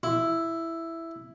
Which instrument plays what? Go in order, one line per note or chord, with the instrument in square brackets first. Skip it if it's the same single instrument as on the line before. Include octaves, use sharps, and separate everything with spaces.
[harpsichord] E4